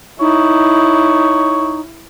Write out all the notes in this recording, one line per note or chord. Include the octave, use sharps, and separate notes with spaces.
D#4 E4 C#5